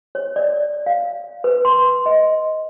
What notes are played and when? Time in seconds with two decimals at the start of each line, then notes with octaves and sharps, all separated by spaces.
0.15 C#5
0.36 D5
0.86 F5
1.44 B4
1.65 C6
2.06 D#5